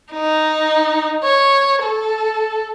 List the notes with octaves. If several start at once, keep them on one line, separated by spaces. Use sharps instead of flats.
D#4
C#5
A4